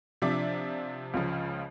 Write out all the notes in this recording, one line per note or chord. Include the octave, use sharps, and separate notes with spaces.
C3 F3 D4 D5 E5 D6
C#2 C#3 F3